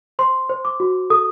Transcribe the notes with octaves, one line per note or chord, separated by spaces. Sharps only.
C5 C6
C5
D6
F#4
A4 D#6